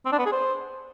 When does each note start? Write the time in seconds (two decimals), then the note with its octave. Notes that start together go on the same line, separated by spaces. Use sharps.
0.06 C4
0.12 D4
0.19 B3
0.26 G#4
0.32 C5